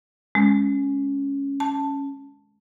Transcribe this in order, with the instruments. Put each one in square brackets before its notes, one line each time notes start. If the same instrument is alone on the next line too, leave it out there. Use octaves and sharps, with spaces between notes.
[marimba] G#3 [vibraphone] C#4
[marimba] A5